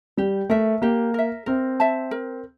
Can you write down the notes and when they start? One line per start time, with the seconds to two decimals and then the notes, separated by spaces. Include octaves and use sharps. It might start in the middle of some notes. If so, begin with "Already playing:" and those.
0.17 G3 G4
0.50 A3 A#4 E5
0.82 A#3 G4
1.14 A#4 E5
1.46 C4 A#4
1.80 E5 A5
2.11 A#4